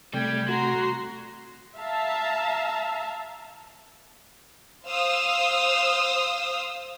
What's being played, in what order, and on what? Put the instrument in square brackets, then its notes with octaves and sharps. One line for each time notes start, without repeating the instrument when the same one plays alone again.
[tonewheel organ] C3 A3 [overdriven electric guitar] G3 D5 [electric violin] G5 G#6
[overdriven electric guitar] F#4 [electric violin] A#5 C6
[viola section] E5 F5 A5 A#5
[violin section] C5 F5 D#6 E6